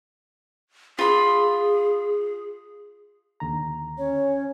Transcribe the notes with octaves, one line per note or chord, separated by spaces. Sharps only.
F4 G#4 B5
D#2 D3 A#5
C#4 C#5